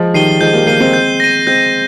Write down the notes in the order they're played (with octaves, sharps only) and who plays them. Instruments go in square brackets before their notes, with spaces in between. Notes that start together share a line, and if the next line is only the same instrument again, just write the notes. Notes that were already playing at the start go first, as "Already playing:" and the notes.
Already playing: [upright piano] F3 G#3
[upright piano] D#3 G3 [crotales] C7 D#7 G7
[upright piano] F3 G#3 [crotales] G6
[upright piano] G3 A#3
[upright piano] G3 A#3 [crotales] C7 D#7 G7
[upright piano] G#3 C4
[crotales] G6
A#6 D#7
[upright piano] G#3 C4 [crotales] G6